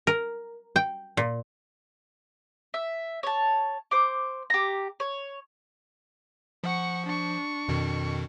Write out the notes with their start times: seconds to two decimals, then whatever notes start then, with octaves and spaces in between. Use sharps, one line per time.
0.07 A#4
0.76 G5
1.17 A#2
2.74 E5
3.23 C#5 A5
3.91 C5 D6
4.50 G4 A#5
5.00 C#5
6.64 F3 F#5 C#6
7.06 D4 C#6
7.68 F2 B2 D#3